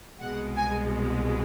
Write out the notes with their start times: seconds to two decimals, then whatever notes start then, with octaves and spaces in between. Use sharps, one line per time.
0.21 C2 B2 G#3 F#5
0.56 G#5